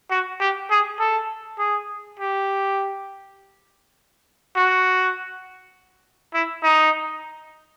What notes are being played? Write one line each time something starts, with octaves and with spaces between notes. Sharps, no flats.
F#4
G4
G#4
A4
G#4
G4
F#4
E4
D#4